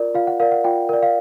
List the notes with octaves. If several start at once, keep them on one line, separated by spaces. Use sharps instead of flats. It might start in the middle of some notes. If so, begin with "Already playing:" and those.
Already playing: F4 A#4 D5
F4 F5
F#5
A#4 D5 F5
F#5
F4 G5
A#4 D5
F5